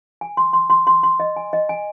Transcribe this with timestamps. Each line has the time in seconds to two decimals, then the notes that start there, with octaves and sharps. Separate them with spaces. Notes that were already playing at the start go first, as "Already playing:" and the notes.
0.21 G#5
0.37 C6
0.53 C6
0.70 C6
0.87 C6
1.03 C6
1.20 D#5
1.36 G#5
1.53 D#5
1.69 G#5